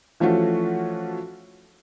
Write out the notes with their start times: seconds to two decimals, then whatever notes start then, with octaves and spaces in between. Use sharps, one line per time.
0.20 E3 F3 A3 C#4 F4 F#4